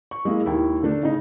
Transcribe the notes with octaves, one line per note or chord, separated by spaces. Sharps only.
C#6
G#3 A#3 E4
D#2 E4
D3 A3 D4
C#3 D#4